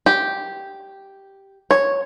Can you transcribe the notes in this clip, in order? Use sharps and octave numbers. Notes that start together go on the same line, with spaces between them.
G4
C#5